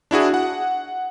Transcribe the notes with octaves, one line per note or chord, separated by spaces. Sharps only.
D4 E4 F#4 G#4
F#5